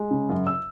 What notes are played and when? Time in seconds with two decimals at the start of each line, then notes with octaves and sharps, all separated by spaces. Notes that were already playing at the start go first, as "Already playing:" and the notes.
Already playing: G#3
0.11 C#3
0.29 F#2
0.47 E6